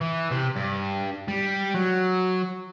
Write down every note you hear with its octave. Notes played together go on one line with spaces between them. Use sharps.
E3
C3
G2
G3
F#3